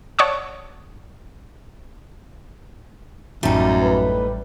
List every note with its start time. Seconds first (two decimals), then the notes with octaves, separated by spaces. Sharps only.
0.19 C#5 D5 F#5 A5 C#6 D#6
3.43 A1 F#2 A2 G3 A3 D#4
3.82 B4